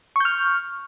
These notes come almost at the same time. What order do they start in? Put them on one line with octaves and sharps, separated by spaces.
C#6 G6 F6